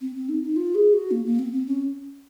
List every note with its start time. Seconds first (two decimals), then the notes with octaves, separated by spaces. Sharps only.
0.01 C4
0.15 C4
0.29 D#4
0.43 D#4
0.56 F4
0.75 G#4
0.93 F#4
1.11 A#3
1.25 A#3
1.39 C4
1.53 C4
1.66 C#4